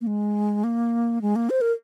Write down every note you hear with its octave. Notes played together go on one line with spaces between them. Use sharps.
A#3
G#3
A#3
G#3
A#3
C5
A#4